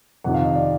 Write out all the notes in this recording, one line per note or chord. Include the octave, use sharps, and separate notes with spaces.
F2 C3 D#3 F#5
F5
D#5
D5